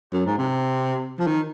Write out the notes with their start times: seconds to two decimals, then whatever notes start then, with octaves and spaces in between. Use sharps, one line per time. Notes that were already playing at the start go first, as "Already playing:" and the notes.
0.13 F#2
0.26 G#2
0.38 C3
1.19 F3
1.27 D#3